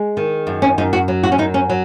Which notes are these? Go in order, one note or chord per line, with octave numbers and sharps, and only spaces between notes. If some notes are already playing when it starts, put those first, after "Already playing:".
Already playing: G#3
D#3
F#2
C#4
F#2 D#4
F#4
F#3
F#4
C#4
F#2 D#4
C#4
F#3